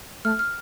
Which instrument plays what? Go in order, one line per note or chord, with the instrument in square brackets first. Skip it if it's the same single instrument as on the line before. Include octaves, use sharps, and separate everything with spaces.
[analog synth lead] A3 [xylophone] F6
[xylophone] F6